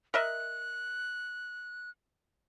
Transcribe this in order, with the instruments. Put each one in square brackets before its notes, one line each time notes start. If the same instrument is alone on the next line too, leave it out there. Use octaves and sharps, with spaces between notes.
[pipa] A#4 D#5 E5 [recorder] F#6